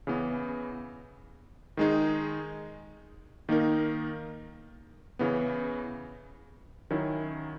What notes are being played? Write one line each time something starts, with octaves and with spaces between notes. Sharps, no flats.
C#3 E3 B3
D#3 G#3 D#4 G#4
D#3 A#3 D#4 A#4
C#3 E3 B3
D#3 F#3 C#4 E4